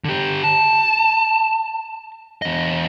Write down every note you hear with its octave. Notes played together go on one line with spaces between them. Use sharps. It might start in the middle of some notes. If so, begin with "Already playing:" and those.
D3 G4
A5
E2 D#5